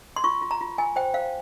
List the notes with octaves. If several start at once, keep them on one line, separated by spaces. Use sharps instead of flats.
C6
F4 C#6
F4
A#5
F4
F4 G#5
C5 G5
C5 F5